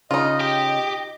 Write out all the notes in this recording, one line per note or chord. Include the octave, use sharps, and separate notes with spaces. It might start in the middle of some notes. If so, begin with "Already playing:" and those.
C#3 D#4 F4 D#5
G4